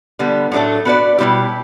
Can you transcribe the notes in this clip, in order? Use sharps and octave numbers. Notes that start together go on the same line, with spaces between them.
D3 G3 B3
A2 F#3 A3 D4 A4
B3 F#4 B4 D5
B2 G3 C4 E4 G4